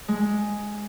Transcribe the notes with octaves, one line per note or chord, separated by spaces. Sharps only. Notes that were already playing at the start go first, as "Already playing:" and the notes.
G#3